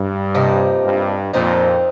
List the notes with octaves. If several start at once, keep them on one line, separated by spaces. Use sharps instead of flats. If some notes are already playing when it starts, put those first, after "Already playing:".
Already playing: G2
C3 F3 A#3 D#4
G2
F2 A#2 F3 C4 D#4